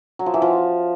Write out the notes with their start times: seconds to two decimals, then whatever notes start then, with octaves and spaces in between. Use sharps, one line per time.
0.19 F#3
0.26 F3
0.34 E3
0.42 F3